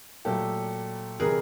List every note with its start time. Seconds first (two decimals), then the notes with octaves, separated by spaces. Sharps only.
0.25 A#2 F#3 A3 G4 A4
1.20 C3 E3 G3 G#4 A#4